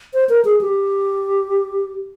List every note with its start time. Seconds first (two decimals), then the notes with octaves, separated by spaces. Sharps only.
0.14 C5
0.29 A#4
0.45 G#4
0.61 G4